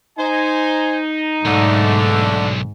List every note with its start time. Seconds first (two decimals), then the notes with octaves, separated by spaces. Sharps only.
0.18 D#4 C5 G#5
1.45 B1 G#2 D3 A3